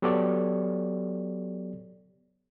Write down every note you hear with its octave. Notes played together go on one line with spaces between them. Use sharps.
F#3 B3 G4 A4 C#5 D5